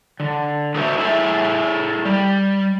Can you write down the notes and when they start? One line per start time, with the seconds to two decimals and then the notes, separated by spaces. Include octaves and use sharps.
0.20 D3
0.75 D4 F#4 A4 C5 D#5 E5
0.98 E4 G#4 A4 E5
2.05 G3